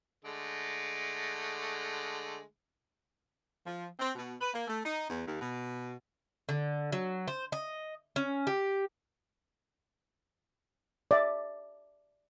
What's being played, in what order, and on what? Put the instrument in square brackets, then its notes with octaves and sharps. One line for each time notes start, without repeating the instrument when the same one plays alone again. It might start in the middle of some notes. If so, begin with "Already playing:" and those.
[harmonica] D3 G#3 A3
[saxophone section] F3
C4
B2
B4
A#3
A3
D#4
E2
D#2
B2
[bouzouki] D3
F#3
C5
D#5
C#4
G4
[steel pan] D5 E5